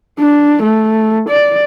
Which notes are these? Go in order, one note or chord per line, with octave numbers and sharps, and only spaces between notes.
D4
A3
D5